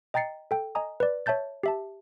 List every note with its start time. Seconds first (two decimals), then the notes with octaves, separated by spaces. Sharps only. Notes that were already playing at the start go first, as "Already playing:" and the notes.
0.14 D#5 G5 A#5 A6 C7 C#7
0.51 A4 G5
0.75 D#5 G#5 A#5 D#6
1.00 B4 D5
1.26 C#5 E5 A5 G6 A6
1.63 G4 E5 A5